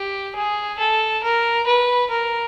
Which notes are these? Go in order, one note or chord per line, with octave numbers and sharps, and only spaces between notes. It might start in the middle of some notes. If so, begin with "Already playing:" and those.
Already playing: G4
G#4
A4
A#4
B4
A#4